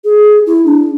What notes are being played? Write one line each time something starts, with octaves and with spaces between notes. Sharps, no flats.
G#4
E4
D4